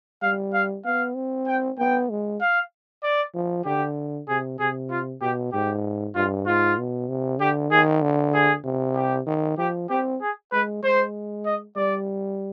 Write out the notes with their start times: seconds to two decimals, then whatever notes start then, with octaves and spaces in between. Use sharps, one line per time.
0.22 G3 F5
0.54 F5
0.85 B3 F5
1.16 C4
1.47 G5
1.79 B3 G5
2.10 G#3
2.41 F5
3.03 D5
3.34 F3
3.66 D3 G4
4.28 C3 G#4
4.59 C3 G#4
4.90 F4
5.21 B2 G4
5.52 G#2 G4
6.15 G2 F4
6.47 G#2 F4
6.78 B2
7.09 C3
7.40 D3 G4
7.71 D#3 G#4
8.02 D3
8.34 G#4
8.65 C3
8.95 G4
9.27 D#3
9.58 F3 G4
9.89 C4 G4
10.21 G#4
10.52 G#3 B4
10.83 G#3 C5
11.46 D#5
11.76 G3 D5